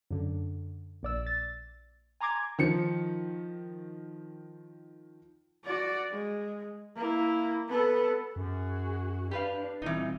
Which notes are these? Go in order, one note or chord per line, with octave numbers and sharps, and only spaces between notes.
F#2 D3
A#1 D5 E6
A6
G#5 A#5 C6 D6 G#6
D#3 F3 C#7
F#4 D5
G#3
A#3 E4
B3 A4
F#2 F#4 G#4
D4 G4 B4 F5
D#1 E3 C4 D#4 F4